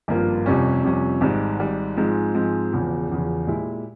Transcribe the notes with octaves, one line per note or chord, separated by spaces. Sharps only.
G#1 G2 F3 A#3 F4
F1 F2 C3 G3 C#4
F1 F2 C3 G3 C#4
G#1 G#2 G3
G#1 G#2 G3
G#2 F3 G#3 C4
G#2 F3 G#3 C4
E1 E2 C#3 F3
E1 E2 C#3 F3
A#2 G#3 E4 G4